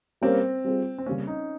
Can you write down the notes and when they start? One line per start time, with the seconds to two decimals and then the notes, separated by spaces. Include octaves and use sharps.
0.21 G3 A#3 C4 C#4 G4 A#4
0.64 G3 C4 F4 G#4
0.98 C4
1.06 C#3 G3 A#3 C#4
1.27 D#4